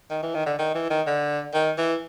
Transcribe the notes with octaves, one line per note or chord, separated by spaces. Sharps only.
D#3
E3
D#3
D3
D#3
E3
D#3
D3
D#3
E3